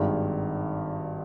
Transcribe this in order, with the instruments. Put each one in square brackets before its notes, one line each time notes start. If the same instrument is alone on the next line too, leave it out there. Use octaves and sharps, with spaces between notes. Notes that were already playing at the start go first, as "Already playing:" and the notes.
Already playing: [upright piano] G#1 G2 D#3 G#3